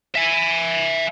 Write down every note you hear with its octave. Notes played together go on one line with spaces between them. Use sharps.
E5 G#5